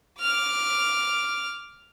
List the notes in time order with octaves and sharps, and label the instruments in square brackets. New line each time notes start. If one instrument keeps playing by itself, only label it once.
[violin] D6 F6